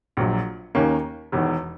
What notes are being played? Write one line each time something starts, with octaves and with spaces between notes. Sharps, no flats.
A#1 A#2 F#3
D#2 D#3 A#3 C#4
E1 E2 D#3